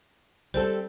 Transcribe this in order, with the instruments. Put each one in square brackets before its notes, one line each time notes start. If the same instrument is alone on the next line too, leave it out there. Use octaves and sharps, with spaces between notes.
[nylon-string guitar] G3 C4 A4 [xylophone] C5